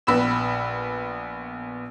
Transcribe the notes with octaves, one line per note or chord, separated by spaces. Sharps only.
A#1 B3 B5 E6 E7